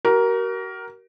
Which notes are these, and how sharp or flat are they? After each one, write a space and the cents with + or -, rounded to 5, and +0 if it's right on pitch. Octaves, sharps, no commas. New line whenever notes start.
F#4 +45 A#4 +10